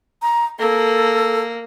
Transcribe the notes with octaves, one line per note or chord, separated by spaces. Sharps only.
A#5
A#3 A4